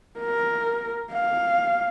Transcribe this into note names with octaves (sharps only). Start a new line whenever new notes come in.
A#4
F5